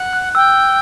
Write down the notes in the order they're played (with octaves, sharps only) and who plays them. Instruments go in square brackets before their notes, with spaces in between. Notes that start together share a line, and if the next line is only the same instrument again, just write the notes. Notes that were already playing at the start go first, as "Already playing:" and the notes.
Already playing: [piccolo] F#5
[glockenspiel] F#6
[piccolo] G5 [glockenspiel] E6